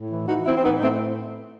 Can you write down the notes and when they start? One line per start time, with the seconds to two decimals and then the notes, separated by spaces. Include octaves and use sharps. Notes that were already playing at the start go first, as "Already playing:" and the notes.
Already playing: A2
0.10 E3
0.28 E3 D#4 F#4
0.46 E3 C4 E4
0.56 C4
0.64 A2 B3 D#4
0.77 D#4
0.82 A2 A3 C4